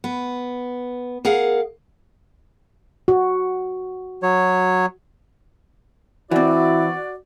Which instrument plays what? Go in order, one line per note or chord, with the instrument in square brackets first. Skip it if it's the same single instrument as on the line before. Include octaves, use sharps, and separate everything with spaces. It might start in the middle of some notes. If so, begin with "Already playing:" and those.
[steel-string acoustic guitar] B3
G#4 A#4 F5 F#5
[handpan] F#4
[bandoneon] F#3 C#5
[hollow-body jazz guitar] E3 C4 [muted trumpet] E4 [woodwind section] F#4 D5